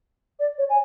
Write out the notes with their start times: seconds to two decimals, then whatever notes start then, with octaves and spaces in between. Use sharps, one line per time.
0.39 D5
0.58 C#5
0.69 G#5